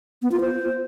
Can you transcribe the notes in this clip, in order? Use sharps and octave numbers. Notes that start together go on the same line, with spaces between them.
B3
F4
C5